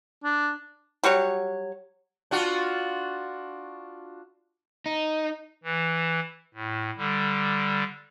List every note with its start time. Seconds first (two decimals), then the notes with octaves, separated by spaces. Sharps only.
0.24 D4
1.03 F#3 G3 F#4 C#5
2.31 D4 F4 F#4
4.86 D#4
5.64 E3
6.54 A2
6.97 D3 G3